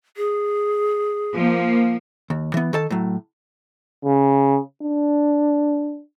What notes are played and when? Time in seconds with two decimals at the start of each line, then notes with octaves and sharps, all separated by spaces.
0.17 G#4
1.33 F3 A#3
2.30 D#2
2.54 E3 B3
2.73 D#3 A4 A5
2.90 A2 F#3
4.05 C#3
4.83 D4